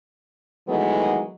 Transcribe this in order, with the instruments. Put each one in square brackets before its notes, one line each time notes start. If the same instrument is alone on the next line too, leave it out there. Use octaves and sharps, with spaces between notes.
[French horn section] D#3 E3 F#3 G#3 A3 B3